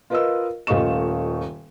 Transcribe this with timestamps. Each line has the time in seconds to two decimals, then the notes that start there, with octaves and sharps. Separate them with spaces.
0.10 F4 A#4 B4 D#5 F5 E6
0.67 D#1 A3 F4 D#5 C#6 E7